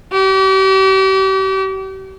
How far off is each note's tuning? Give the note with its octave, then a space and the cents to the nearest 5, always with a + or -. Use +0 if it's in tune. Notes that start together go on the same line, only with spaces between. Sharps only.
G4 -40